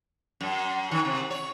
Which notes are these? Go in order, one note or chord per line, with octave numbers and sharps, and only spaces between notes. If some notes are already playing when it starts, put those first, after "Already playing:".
F#2
D#3
C3
C#5